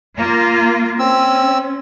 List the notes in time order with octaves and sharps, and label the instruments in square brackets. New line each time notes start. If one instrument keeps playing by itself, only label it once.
[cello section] A#3 F4
[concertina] C4 E6 [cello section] C#4